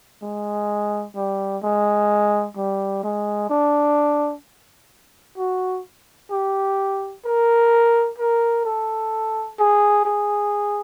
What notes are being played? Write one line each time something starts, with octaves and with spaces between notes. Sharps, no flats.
G#3
G3
G#3
G3
G#3
D4
F#4
G4
A#4
A#4
A4
G#4
G#4